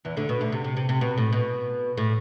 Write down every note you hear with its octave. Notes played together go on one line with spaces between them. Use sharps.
E2 E3
D2 D3
B2
D2 D3
C3
C3
C3
C3
B2
A2
B2
A2